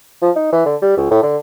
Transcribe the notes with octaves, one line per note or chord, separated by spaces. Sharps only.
F3
D#4
E3
D3
G3
C#2
A2
D3